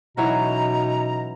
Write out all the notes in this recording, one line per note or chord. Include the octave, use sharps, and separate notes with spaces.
B2 E3 F#3 C#4 D#4 A#5